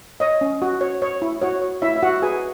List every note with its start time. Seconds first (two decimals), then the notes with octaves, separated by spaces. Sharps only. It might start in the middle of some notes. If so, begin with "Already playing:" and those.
0.20 C#5 D#5
0.41 C#4
0.62 F#4
0.81 C#5
1.02 C#5
1.22 E4
1.42 F#4 C#5
1.62 C#5
1.82 E4 C#5 E5
1.96 E5
2.03 D#4 F#4 F#5
2.22 G#4 B4 G#5